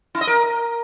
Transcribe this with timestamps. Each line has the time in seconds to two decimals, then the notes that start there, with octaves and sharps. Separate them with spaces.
0.15 E4
0.21 D#5
0.27 A#4